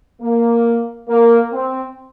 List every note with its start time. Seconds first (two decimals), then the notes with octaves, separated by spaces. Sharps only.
0.22 A#3
1.09 A#3
1.52 C4